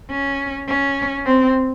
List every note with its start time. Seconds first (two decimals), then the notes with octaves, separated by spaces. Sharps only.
0.11 C#4
0.68 C#4
1.26 C4